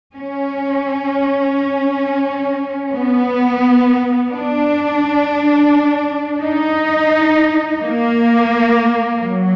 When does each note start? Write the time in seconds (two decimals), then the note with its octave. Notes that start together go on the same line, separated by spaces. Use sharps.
0.15 C#4
2.94 B3
4.33 D4
6.43 D#4
7.83 A#3
9.22 F#3